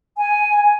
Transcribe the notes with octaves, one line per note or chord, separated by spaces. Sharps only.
G#5